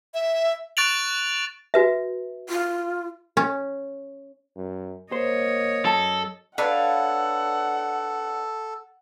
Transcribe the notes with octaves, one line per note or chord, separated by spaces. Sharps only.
E5
C#6 F#6 A6 D7 F7 F#7
F#4 B4 E5
F4
C#4
F#2
A#3 C5 C#5 D#5
F#2 A4 A5
D4 A4 B4 C#5 F5 F#5